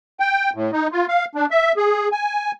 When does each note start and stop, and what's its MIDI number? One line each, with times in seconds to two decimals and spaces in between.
0.20 0.50 79
0.55 0.71 45
0.73 0.88 63
0.92 1.06 65
1.08 1.25 77
1.35 1.46 62
1.51 1.72 76
1.77 2.08 68
2.12 2.52 80